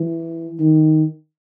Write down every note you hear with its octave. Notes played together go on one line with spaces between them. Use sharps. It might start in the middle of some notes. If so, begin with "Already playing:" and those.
Already playing: E3
D#3